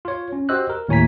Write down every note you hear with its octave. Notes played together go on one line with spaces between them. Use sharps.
F4 C#5
C#4
F#4 G4 C5 D#5 E6 F#6
A#4
D#2 A2 C#5 G#5 A#5 B6